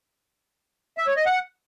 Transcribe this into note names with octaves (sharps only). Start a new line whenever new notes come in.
E5
C#5
D#5
F#5